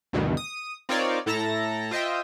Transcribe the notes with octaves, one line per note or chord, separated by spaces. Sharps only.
D2 G2 B2 D#3 E3
D#6
C4 D#4 F4 A#4 C#5 D5
A2 E4 A4 A5 A#5 A#6
F4 C5 D#5 E5 G5